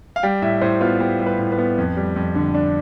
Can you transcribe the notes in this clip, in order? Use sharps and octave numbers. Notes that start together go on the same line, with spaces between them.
F5
G3 G5
A2 E5
A2 C5
B3 F4
B3 G4
G3
B4
A2
B4
B3
F2
G3
F2
D3
D4